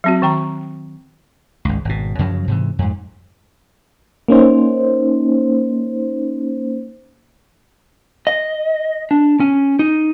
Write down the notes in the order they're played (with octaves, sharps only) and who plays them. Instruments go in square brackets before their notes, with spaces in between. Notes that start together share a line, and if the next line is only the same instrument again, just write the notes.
[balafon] F#3 C4 F#4
D#3 G5 A#5
[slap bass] G#1 C#2
G#1 B2
F#2 C#3 F3 F#3
G#2 C3 E3
F2 G#2
[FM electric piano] A#3 C#4 D#4 C5
[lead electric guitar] D#5
D4
C#4
D#4